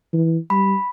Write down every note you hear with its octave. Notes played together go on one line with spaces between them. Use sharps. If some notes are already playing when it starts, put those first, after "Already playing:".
E3
G3 B5